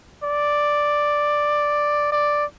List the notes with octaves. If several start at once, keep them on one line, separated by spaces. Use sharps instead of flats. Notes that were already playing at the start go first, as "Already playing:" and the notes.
D5
D5